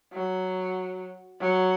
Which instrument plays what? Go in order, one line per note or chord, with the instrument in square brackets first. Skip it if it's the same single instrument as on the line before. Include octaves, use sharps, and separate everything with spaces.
[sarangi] F#3
F#3